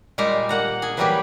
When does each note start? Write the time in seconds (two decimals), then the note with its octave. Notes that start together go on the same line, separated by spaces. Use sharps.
0.18 A#2 G3 G#3 G4 F5 A#5
0.49 A#3 F#5 A#5
0.82 G#4
0.97 E3 F#3 G3 A#3 G4 B4